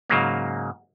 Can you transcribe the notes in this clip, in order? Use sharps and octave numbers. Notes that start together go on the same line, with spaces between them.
G#2 C#3 F#3 A#3